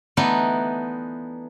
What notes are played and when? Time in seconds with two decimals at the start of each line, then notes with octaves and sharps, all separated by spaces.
0.17 E3 A3 B3 D4 D#4